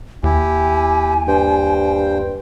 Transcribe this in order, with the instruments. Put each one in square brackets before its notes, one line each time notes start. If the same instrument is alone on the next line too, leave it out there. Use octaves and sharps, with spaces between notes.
[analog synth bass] D#2 [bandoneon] E4 G4 [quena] G#5
[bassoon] G2 [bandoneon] C5 G5